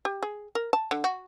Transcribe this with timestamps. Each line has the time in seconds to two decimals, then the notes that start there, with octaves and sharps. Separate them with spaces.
0.05 G4
0.23 G#4
0.55 A#4
0.73 A5
0.91 D3
1.04 F#4